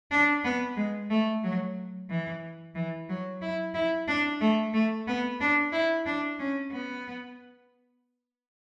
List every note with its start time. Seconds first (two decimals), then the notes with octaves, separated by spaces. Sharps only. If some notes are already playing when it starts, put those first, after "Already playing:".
0.11 D4
0.44 B3
0.76 G#3
1.10 A3
1.44 F#3
2.10 E3
2.75 E3
3.09 F#3
3.41 E4
3.74 E4
4.08 D4
4.41 A3
4.74 A3
5.07 B3
5.40 D4
5.72 E4
6.06 D4
6.39 C#4
6.72 B3